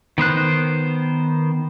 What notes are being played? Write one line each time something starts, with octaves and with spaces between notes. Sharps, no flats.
D#3 B3 C5 F#6